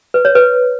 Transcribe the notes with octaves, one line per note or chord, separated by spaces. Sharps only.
B4
C#5
B4